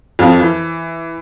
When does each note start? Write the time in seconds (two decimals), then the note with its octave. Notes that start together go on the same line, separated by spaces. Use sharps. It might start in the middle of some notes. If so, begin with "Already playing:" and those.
0.19 F2 F4
0.40 E3